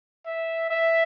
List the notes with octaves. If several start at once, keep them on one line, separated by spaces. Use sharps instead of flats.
E5
E5